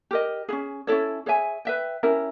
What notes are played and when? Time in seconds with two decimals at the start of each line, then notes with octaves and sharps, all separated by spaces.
0.11 G4 A#4 D#5
0.49 E4 G#4
0.53 C#4
0.87 C#4 E4 A4 C#5
1.26 G#4 C#5 E5 G#5
1.65 B4 E5 G5
2.03 C#4 E4 G4 A#4